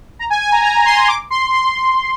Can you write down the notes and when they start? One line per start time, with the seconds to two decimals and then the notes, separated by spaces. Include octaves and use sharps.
0.19 A#5
0.30 G#5
0.42 G#5
0.52 A#5
0.64 A#5
0.85 C6
1.08 D6
1.30 C6
1.52 C6